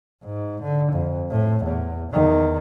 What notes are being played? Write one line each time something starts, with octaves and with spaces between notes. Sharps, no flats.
G#2
D3
F2
A2
E2
E2 D#3